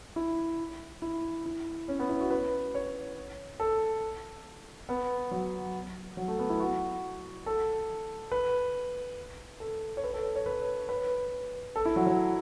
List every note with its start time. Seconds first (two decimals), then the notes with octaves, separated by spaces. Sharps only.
0.16 E4
1.02 E4
1.46 E4
1.88 C#4
1.99 B3
2.09 E4
2.20 F#4
2.31 B4
2.75 C#5
3.60 A4
4.89 B3
5.31 F#3
6.17 F#3
6.28 A3
6.39 B3
6.50 E4
6.60 F#4
7.46 A4
8.32 B4
9.60 A4
9.97 C#5
10.04 B4
10.14 A4
10.35 C#5
10.46 B4
10.89 B4
11.76 A4
11.85 E4
11.96 F#3
12.07 F#3